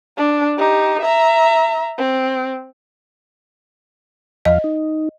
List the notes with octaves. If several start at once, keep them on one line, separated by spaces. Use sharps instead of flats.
D4
D#4 G4
E5 A#5
C4
E2 F3 D#5 F5
D#4